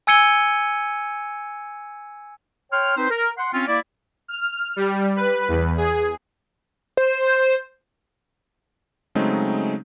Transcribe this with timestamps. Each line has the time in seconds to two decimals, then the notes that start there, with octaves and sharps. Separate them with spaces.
0.07 G#5 E6 G#6 C#7 D#7 G7
2.72 C#5 G5 C6 F6
2.97 C4 D#4 B4 C5
3.10 A#4
3.38 F#5 C6
3.53 C4 C#4 F4
3.67 A#3 E4 D5
4.28 F6
4.76 G3
5.16 B4
5.48 E2
5.77 G#4
6.97 C5
9.15 C#3 F#3 G#3 A3 C4 D#4